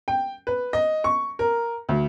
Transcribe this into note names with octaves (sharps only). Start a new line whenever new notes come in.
G5
B4
D#5
C#6
A#4
D2